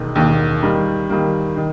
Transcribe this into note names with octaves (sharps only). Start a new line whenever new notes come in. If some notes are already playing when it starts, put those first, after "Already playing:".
Already playing: E1 D#2 D#3
E1 D#2 D#3
D#3 G3 A#3
D#3 G3 A#3
D#3